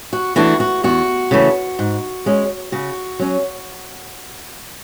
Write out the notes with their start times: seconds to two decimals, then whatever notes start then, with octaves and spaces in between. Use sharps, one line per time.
0.13 F#4
0.36 E3 A3 D4 F#4
0.60 F#4
0.84 E2 F#4
1.31 C#3 E3 A3
1.79 G#2
2.26 G#3 C#4
2.72 C#3 F#4
3.19 F#3 C#4